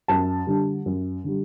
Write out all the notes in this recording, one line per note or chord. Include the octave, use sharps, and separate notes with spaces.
F#2 A5
D3 G3
F#2
D3 G3